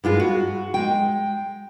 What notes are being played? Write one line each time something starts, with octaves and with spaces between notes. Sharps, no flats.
G2 G#3 F4 B4
F#4
G#3 G5